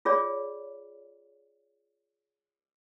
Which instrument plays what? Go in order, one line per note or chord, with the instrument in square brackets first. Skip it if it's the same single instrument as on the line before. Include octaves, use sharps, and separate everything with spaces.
[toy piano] F4 G#4 C#5 D5